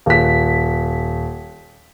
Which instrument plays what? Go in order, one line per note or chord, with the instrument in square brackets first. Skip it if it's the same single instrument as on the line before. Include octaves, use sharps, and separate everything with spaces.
[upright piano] D#1 B6